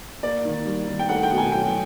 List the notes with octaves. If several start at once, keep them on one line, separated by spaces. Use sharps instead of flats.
A#3 D5
D#3
G3
D#3
G5
A3 F#5
G5
B2
G#5
F#3 G5